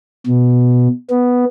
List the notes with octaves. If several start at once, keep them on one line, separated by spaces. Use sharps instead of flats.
B2
B3